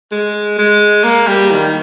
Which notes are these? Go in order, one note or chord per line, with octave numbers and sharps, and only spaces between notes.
G#3
G#3
A#3
G3
D#3